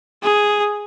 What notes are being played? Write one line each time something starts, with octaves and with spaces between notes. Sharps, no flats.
G#4